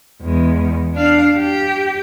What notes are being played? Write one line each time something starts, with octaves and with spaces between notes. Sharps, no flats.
E2 G#3
D4 F5
G4